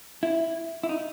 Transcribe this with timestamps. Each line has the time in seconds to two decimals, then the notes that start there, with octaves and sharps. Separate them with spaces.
0.23 E4
0.83 E4
0.89 D#4